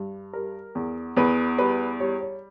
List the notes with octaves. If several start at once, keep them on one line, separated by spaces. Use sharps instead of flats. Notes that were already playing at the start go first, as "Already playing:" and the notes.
Already playing: G2
G3 A#4
E2
E2 B4
G3 B4
G3 C#5
C#5